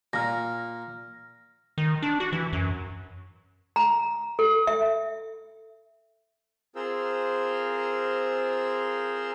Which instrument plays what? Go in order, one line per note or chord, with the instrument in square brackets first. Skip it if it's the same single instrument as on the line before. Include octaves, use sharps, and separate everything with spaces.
[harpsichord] A#2 [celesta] F6 A#6
[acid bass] D#3
D4
F#4
E3
F#2
[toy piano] A#5
A4
E5
[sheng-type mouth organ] C4 F4 G#4 A#4 C5 E6